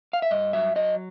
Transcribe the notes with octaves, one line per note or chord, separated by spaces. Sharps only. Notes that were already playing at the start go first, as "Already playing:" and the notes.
F5
E5
G2 D#5
F#3 E5
F#3 D#5